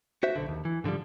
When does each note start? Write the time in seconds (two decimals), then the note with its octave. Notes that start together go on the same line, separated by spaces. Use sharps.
0.23 F#4 C5 E5
0.36 B1 D3
0.48 D#2
0.65 E3
0.84 G#2 D3 F3 G3